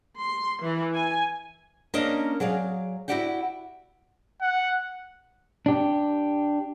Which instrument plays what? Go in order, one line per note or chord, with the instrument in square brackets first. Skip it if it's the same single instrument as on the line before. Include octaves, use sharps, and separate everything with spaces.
[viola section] C6
E3
G#5
[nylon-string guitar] A#3 C#4 D4 A#4 D5 D#5
F#3 G#4 D5 F5
E4 F#4 G4 D5 F#5 G5
[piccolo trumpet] F#5
[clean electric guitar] D4 G4